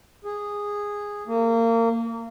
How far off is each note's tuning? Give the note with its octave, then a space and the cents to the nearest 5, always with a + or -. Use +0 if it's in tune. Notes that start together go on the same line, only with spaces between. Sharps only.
G#4 -10
A#3 -30